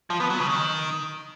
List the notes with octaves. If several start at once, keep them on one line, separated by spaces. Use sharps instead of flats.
F3
B3
F#3
C#3
D#3